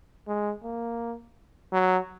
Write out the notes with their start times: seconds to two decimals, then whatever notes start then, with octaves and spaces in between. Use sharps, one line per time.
0.27 G#3
0.64 A#3
1.73 F#3